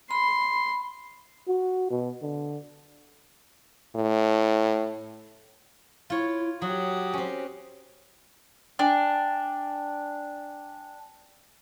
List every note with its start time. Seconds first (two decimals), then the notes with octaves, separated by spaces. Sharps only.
0.11 B5 C6
1.48 F#4
1.90 B2
2.22 D3
3.96 A2
6.10 E4 F4 C#5
6.62 F#3 F#4 G4 D#6
7.14 C4 C#4
8.79 D4 G5 G#5